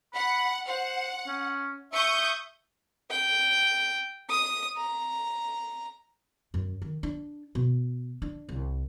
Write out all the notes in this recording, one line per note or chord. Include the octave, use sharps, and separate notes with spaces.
F#5 B5
C5 F#5
C#4
E5 C#6 D#6 G6
G5
D#6
A#5
F#2
D#3
D4
B2
D4
C2